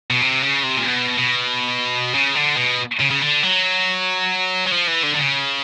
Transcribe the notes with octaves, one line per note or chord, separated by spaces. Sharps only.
B2
C3
C#3
C3
A#2
B2
B2
C#3
D3
B2
C#3
C#3
D3
F#3
F#3
F3
E3
D3
D3
C#3